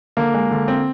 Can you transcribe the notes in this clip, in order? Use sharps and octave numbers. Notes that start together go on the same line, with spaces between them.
D3 A#3
G#3
D3
C4